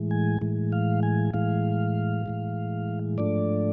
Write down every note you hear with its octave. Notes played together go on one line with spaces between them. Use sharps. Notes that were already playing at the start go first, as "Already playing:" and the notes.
Already playing: A2 E3 G#3
G#5
A2 E3 G#3
F5
G#5
A2 E3 G#3 F5
A2 E3 G#3
G#2 F3 A3 D4 D5